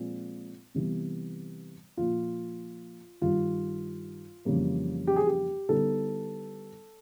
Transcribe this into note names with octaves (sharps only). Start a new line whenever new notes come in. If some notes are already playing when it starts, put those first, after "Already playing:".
Already playing: A#2 F3 G#3 C4
C3 E3 G3 B3
A#2 F3 A#3 F4
G2 D#3 G3 F4
F2 C#3 E3 G3 A#3
G4
G#4
G4
D3 G3 B3 D#4 A4